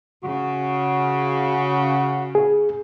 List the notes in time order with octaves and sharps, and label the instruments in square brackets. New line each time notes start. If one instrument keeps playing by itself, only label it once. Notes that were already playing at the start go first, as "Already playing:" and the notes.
[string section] C#3 [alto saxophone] F#4
[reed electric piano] G#4